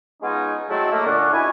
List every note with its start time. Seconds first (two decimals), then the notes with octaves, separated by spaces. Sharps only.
0.22 G#3 B3 C#4 D#4 F4 G#4
0.69 F#3 G#3 A3 C4 E4 A4
0.91 A3 A#3
1.06 A#2 D3 C#4 D4 C#5 F#5
1.33 F#2 E4 C#5 D#5 G#5